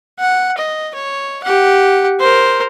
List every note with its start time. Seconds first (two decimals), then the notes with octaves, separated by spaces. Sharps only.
0.19 F#5
0.57 D#5
0.95 C#5
1.44 G4 F#5
2.20 A#4 C5